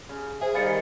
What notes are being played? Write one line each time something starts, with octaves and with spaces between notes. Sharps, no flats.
C#3
G#4 C5 E5
D#3 G3 F5 A6 C#7